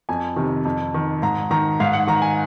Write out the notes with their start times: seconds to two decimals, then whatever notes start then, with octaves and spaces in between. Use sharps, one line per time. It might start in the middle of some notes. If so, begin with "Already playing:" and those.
0.09 F2 G#5
0.36 C3 D#3
0.65 F2
0.94 D#3
1.22 G#2 A#5
1.51 D#3 A#5
1.80 G#2 F5
1.93 F#5
2.07 D#3 A#5
2.22 G#5